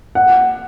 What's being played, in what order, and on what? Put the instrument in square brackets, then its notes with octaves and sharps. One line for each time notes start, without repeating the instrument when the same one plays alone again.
[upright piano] F#5